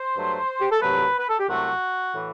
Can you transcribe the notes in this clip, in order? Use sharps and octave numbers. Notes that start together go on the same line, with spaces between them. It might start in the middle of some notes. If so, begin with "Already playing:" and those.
Already playing: C5
G2 F#3 A3
G4
A4
C2 C3 F#3 A3 B4
B4
A4
G4
C2 C3 F#3 A3 F#4
A2 E3